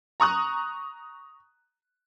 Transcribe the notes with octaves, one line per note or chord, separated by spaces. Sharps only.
A#5 C#6 D#6 F#6